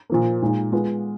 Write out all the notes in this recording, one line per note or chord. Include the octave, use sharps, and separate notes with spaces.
A#2 F3 A#3
A#2 G#3 D#4
G#3 B3 F4